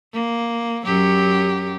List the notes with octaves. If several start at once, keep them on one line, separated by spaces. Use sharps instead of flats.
A#3
F#2 F#3 G4